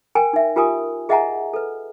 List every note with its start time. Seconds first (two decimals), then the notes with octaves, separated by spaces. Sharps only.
0.15 A#4 G5 G#5
0.33 D#4 E5
0.56 F4 G4 A#4 G#5 D#6
1.09 G#4 D#5 E5 F#5 G#5 A#5
1.53 A4 B4